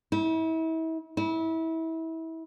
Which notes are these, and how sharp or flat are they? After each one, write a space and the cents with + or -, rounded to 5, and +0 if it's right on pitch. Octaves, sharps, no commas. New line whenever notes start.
E4 -35
E4 -25